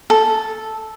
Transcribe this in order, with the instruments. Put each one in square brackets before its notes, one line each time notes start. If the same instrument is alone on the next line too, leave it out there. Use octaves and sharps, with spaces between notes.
[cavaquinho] A4